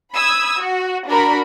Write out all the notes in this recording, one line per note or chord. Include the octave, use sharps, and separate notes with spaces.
B5 D#6 E6 G#6
F#4
D4 F#4 A#4 B5